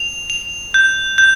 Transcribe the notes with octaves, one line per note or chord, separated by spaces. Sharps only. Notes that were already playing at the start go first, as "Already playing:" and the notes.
Already playing: F7
F7
G6
G6